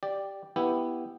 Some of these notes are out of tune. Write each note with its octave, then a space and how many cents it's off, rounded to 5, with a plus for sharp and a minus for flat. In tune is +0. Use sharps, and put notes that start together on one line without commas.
G4 +0 D5 +0
B3 +0 E4 +0 G4 +0